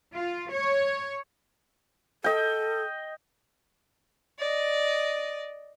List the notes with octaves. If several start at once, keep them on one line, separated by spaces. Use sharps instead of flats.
F4
C#5
A4 D#5 G5
D5 D#5